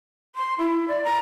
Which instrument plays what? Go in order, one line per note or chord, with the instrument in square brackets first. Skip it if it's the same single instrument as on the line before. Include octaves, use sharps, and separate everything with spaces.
[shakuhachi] C6
E4
D5
A#5